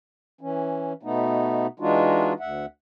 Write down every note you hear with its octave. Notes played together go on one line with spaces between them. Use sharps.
E3 C#4
B2 A3 B3 D#4
E3 G#3 D4 D#4 F4 F#4
D2 E5 F#5